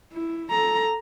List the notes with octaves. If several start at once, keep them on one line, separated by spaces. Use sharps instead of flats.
E4
A4 A#5